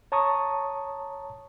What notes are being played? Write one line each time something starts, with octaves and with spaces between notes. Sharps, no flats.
C#5 A5 A#5 C#6 D#6